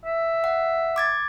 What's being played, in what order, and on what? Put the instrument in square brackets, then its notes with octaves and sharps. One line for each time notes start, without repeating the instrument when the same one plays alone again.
[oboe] E5
[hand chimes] F#5
D6 G#6 A6